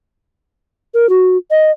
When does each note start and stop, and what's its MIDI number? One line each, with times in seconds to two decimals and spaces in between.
0.94 1.09 70
1.09 1.37 66
1.51 1.71 75